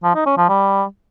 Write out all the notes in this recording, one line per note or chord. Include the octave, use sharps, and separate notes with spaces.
F3
D#4
C#4
F3
G3